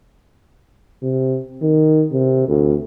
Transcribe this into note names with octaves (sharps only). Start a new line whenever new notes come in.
C3
D#3
C3
D2